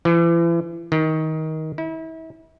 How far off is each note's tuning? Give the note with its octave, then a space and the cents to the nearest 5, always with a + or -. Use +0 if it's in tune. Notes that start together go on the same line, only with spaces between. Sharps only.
E3 +40
D#3 +20
E4 -35